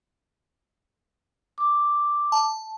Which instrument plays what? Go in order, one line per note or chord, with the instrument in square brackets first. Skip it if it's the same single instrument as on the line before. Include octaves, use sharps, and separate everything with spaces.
[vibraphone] D6
[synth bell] A5